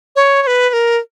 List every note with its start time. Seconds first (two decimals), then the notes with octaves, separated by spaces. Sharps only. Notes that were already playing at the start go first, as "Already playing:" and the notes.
0.16 C#5
0.42 C#5
0.47 B4
0.69 B4
0.73 A#4